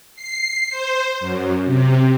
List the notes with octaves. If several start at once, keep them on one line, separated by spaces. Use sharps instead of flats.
C7
C5
F#2
C3